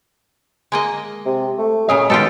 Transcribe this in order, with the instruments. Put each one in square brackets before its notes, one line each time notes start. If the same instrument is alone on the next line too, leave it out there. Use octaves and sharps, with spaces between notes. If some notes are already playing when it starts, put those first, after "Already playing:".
[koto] G#3 A#3 D#5
[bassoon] C3
A3
[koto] A#2 C#3 F5 [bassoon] C#4 [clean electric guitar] D#5
[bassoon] B2 [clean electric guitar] D#3 G#3 [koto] F4 G4 A4